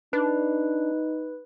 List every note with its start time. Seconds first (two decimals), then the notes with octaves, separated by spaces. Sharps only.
0.13 D4 D#4 B4